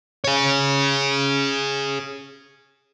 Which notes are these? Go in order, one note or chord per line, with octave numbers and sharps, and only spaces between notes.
G#4 C#5